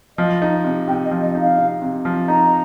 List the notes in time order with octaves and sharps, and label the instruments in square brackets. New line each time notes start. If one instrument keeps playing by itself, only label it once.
[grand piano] F3 [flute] D#5
[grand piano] D#4
C3
[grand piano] C3 [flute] G5
[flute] D#5
[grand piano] F3
[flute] D#5
[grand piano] D#4
[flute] F5
[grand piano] C3
C3
F3
[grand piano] D#4 [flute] A#5